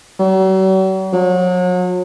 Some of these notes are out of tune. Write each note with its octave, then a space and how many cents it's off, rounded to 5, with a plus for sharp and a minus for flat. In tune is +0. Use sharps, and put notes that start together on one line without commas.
F#3 +45
F#3 -35